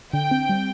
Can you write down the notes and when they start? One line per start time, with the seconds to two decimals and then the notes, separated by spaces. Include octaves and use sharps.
0.13 D3 G5
0.31 C4
0.49 G3